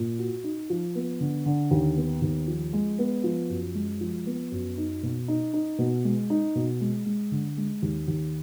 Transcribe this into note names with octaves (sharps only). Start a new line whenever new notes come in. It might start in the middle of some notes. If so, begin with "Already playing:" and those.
Already playing: A#2
F#4
D#4
F3
B3
D3
D3
D#2
B3
D#2
F3
G#3
B3
F3
F#2
G#3
F3
B3
F#2
D#4
B2
D#4
D#4
B2
G#3
D#4
B2
G#3
G#3
D3
G#3
D#2
D#2